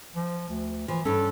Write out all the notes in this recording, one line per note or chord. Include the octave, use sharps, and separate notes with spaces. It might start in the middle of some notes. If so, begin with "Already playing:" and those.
F3
D2
E3 F3
G2 C#4 A4